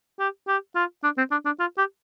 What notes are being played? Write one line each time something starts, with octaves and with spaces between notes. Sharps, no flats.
G4
G4
F4
D4
C4
D4
D4
F4
G4